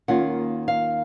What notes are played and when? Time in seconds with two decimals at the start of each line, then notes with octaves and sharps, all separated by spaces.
0.08 D#2 D#3 A#3 C#4 F4 F#5
0.68 F5